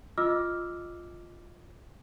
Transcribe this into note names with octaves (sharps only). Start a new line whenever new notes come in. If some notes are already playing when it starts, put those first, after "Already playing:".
F4 D#5 D6 E6 F6